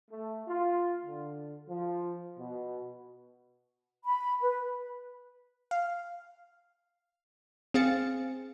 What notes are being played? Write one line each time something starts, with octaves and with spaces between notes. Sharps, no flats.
A3
F4
D3
F3
B2
B5
B4
F5
C4 G#4 F5 A6 C#7